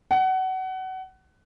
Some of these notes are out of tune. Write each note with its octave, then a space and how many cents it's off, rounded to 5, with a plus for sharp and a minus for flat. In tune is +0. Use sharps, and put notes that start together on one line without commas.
F#5 +25